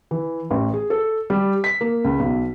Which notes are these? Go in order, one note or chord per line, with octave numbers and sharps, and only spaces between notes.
E3
A1
G#4
A4
G3
B6
A#3
C#2
B1